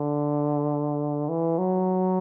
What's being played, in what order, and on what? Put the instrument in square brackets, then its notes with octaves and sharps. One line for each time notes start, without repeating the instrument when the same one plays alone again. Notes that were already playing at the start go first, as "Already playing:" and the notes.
Already playing: [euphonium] D3
E3
F#3